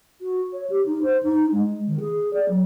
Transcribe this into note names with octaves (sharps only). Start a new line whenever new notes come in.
F#4
C#5
G4
D#4
C5
D#4
G#3
D#3
G#4
D5
F#3